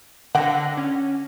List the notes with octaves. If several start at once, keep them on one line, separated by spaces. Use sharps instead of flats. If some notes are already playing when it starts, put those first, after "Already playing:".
D3 F#5 G5 D6 A#6
C#4